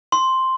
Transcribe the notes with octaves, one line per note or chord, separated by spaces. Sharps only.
C6